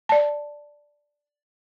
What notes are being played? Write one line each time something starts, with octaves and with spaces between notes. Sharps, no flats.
D5 A5